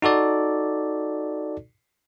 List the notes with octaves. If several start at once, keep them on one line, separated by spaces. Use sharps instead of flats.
D#4 F#4 A4 D5